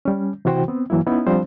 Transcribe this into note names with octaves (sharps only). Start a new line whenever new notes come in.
G3 C#4
C3 E3 E4 F#4 C5 G5
B3 C4
G2 E3 F#3 A#3 E4
B3 C#4 D#4 E4
F3 G3 C4 D4 C5